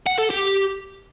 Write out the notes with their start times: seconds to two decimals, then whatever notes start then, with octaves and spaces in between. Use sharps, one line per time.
0.06 F#5
0.18 A4
0.30 G4